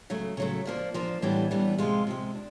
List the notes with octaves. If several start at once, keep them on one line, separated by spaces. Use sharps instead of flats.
C#3 F#3 A3
C#3 F#3 A3
F3 A#3 D4
F3 A#3 D4
A2 E3 G3 B3 D4 G4
A2 E3 G3 B3 D4
C3 F3 G#3 F4
C3 F3 G#3
D4